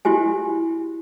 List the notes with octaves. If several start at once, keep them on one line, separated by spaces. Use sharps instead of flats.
E4 F#4 G4 G#5